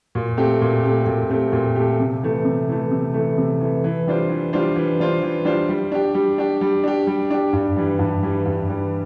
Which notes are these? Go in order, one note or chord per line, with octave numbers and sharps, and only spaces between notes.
A#2
A3 C4 G4
A#2
A3 C4 G4
A#2
A3 C4 G4
A#2
A3 C4 G4
C3
E3 A3
C3
E3 A3
C3
E3 A3
C3
E3 A3
E3
G3 D4 F4 C5
E3
G3 D4 F4 C5
E3
G3 D4 F4 C5
E3
G3 D4 F4 C5
G3
D4 G4
G3
D4 G4
G3
D4 G4
G3
D4 G4
G2
E3 G3
G2
E3 G3
G2
E3 G3